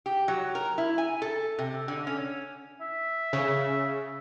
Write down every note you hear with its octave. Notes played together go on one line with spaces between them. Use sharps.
G4
F#3
A#4
E4
G#5
A4
C3
D3
C#4
E5
C#3